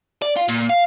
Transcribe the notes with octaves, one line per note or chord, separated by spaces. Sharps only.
D5
F4
A#2
F5